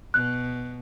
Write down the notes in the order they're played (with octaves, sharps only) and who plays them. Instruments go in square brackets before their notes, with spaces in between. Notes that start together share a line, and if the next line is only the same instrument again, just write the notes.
[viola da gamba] B2 [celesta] F#6